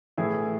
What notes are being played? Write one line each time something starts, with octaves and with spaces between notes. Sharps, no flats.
A2 E3 E4 G#4